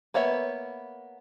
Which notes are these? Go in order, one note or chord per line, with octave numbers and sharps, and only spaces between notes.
A#3 B3 C#5 E5